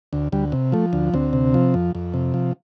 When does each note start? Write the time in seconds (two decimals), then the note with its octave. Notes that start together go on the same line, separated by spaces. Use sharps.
0.13 D2
0.32 D2 G3
0.52 C3
0.72 F3 A3
0.93 D2
1.14 D2 C4
1.33 C3
1.54 F3
1.74 F2
1.95 F2
2.14 C3
2.34 F3